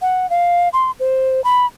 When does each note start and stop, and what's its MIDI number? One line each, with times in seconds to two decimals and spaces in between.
0.02 0.29 78
0.30 0.69 77
0.73 0.91 84
1.00 1.41 72
1.44 1.66 83